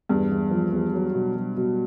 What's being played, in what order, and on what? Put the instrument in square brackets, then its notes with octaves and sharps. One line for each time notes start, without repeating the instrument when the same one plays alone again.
[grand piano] E2 [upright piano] G2
[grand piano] E2
F3
E2
F#3
B2
F#3
B2